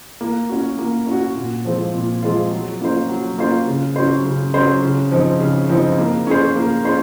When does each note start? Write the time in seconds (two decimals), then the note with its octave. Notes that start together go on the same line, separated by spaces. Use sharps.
0.21 A#3
0.49 C#4 F#4
0.78 A#3
1.07 C#4 F#4
1.36 A#2
1.65 F3 G#3 C4 F4
1.94 A#2
2.23 F3 G#3 C4 F4
2.51 F#3
2.81 A#3 C#4 F4 C5
3.09 F#3
3.38 A#3 C#4 F4 C5
3.67 C#3
3.96 F#3 C#4 F#4 C5
4.25 C#3
4.54 F#3 C#4 F#4 C5
4.82 C#3
5.12 F3 C4 D#4
5.40 C#3
5.69 F3 C4 D#4
5.98 A#3
6.27 C#4 G#4 C5
6.56 A#3
6.85 C#4 G#4 C5